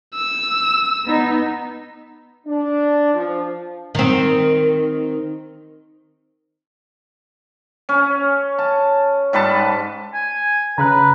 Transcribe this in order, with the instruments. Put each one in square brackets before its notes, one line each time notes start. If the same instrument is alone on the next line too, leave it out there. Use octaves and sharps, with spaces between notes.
[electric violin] E6
[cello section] B3 D#4
[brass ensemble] D4
F3
[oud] D#3 C4
[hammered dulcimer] C#4
A5
G#2 G3 B4 A5
[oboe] G#5
[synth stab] C#3 [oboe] B4 [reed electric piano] A#5 B5 F#6